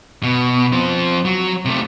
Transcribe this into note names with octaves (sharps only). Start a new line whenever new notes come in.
B2
F3 C4
F#3
C3 A3